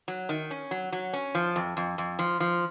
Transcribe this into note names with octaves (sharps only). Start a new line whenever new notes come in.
F#3
D#3
C#4
F#3
F#3
C#4
F3
F2
F2
F2
F3
F3